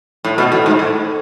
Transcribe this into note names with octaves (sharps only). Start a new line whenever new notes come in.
A2
B2
A2
G#2
A2